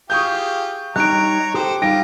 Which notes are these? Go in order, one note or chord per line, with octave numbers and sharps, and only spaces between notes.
F4 G4 G#4 C#6 D#6 G6
G3 D#4 C#5 A#5 F#6 D7
G4 A4 C5 G5
G3 D#4 F4 G5 A#6 D7